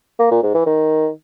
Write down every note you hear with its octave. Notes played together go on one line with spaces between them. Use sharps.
A#3
A#2
G#2
E3
D#3